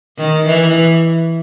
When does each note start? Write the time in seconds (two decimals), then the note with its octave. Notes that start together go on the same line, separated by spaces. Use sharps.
0.18 D#3
0.47 E3